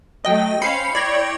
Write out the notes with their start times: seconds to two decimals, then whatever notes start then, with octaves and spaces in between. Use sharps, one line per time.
0.25 F#3 A3 D#5 G5
0.62 C#4 C5 F5 B5 C7 C#7
0.95 E4 C#5 D5 G5 G#6 A#6